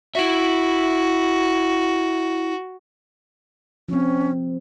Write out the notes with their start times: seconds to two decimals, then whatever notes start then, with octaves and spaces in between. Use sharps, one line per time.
0.15 E4 F#4 E5
3.89 F3 C4 C#4